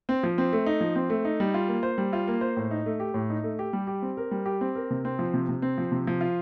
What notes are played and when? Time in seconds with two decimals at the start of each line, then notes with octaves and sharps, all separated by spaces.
0.09 C4
0.23 F3
0.38 C4
0.53 A3
0.66 D#4
0.81 F3
0.96 C4
1.10 A3
1.25 D#4
1.40 G3
1.54 F4
1.68 A#3
1.83 C5
1.98 G3
2.13 F4
2.28 A#3
2.41 C5
2.57 A2
2.71 D#4
2.86 A3
3.00 G4
3.14 A2
3.30 D#4
3.44 A3
3.59 G4
3.73 G3
3.87 G4
4.02 C4
4.17 A#4
4.31 G3
4.46 G4
4.61 C4
4.75 A#4
4.91 C3
5.05 C4
5.19 F3
5.34 C3
5.49 C3
5.62 C4
5.78 F3
5.92 C3
6.07 F3
6.21 F4